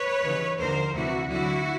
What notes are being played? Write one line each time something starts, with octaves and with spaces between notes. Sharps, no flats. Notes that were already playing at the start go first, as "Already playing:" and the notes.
Already playing: B4 C#5
D#2 C#3 E3
D#2 D3 F3 A#4 C5
D2 C3 E3 E4 F#4
D2 D3 F#3 E4 F#4